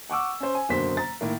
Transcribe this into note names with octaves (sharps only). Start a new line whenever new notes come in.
F#5 C#6 D6 E6
C#4 C5
G#5
F#1 B2 D3 A#3 C5 B6
A#5 A6
A2 D#3 A#3